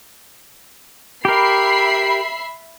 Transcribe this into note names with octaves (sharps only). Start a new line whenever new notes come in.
G4 A#4 E5 B5 C7